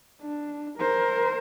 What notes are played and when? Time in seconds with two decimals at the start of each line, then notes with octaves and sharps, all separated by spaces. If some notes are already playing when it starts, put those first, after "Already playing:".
0.22 D4
0.78 A#4 C5